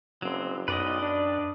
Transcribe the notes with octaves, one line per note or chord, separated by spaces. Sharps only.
F#1 F#3 C4
B1 F#2 B4 D5 D#5
D4